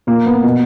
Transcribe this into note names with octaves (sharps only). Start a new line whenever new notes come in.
A#2 A#3
B3
B2